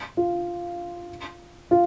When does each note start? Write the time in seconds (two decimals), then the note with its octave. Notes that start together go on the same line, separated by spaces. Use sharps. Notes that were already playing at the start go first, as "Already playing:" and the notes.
0.17 F4
1.71 F4